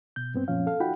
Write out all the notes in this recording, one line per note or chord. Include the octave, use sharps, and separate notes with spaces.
B2 G6
G2 B3 C4
F#2 A#2 F3 C#4 F5
A4 F5
D#4 F4 F#4 F#5 G5 B5